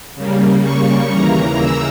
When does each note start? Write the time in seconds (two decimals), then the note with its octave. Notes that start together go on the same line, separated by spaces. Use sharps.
0.15 C#3 G3 A#3
0.63 C#6
1.10 D#2 C#3 E3 A#3 A#5
1.57 E6